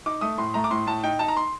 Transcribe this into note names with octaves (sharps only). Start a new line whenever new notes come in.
D#4 D6
A3 D#6
A2 C6
A3 A#5
D6
A2 C6
A2 A5
D#4 G5
D#4 A5
A#5
C6